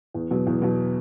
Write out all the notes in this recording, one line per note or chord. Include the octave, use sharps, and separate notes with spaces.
E2
B2 F#3
E2
B2 F#3